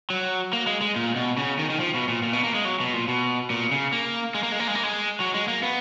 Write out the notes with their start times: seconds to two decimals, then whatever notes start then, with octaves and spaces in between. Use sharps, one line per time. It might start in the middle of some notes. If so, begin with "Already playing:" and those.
0.10 F#3
0.53 A#3
0.67 G#3
0.81 G#3
0.96 A#2
1.16 B2
1.38 C#3
1.59 D#3
1.70 D#3
1.80 F3
1.94 B2
2.09 A#2
2.23 A#2
2.33 B2
2.44 A#3
2.54 G#3
2.65 F#3
2.80 B2
2.93 A#2
3.08 B2
3.50 A#2
3.71 C#3
3.93 A#3
4.35 G#3
4.43 A#3
4.52 G#3
4.60 A#3
4.67 G#3
4.75 A#3
4.83 G#3
5.20 F#3
5.34 G#3
5.48 A#3
5.63 B3